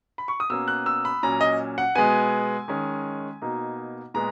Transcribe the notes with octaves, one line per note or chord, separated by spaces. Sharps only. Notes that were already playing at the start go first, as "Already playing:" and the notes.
B5
C#6
D#6
B2 A#3 C#4 E6
F#6
E6
B5
A#2 F#3 C#4 A#5
D#5
F#5
B2 G#3 B3 G#5
D#3 G#3 C#4
B2 A#3 D#4
A#2 G#3 B3 A#5